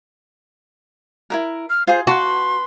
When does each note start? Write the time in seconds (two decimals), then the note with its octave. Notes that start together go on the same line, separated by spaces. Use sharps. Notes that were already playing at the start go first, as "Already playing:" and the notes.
1.30 E4 G4 A#4
1.70 F6
1.87 F4 G#4 C5
2.07 F#4 B4 A5 C6